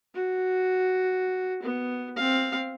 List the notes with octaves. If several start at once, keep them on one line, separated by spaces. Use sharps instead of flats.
F#4
B3
C4 F5